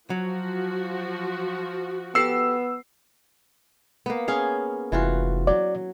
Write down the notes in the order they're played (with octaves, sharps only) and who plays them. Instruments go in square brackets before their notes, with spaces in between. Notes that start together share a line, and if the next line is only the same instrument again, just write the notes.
[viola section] F3 F#4 [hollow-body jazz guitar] F#3
[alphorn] B3 [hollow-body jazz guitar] G4 A4 F#5 [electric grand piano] E6 C7
[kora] A#3 B3
C#4 G#4 F5
[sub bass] F1 [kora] E3 F4 F#4
[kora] F#3 [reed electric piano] D5